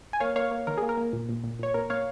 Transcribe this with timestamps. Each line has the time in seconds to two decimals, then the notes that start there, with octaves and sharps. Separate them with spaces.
0.13 G#5
0.20 A#3 C#5 F5
0.36 A#3 C#5 F5
0.51 A#3
0.67 D#3 A#4
0.78 A#3 G#4
0.89 A#4
0.97 A#3
1.13 A#2
1.29 A#2
1.44 A#2
1.59 A#2 C#5
1.74 A#2 A#4
1.90 A#2 C#5 F5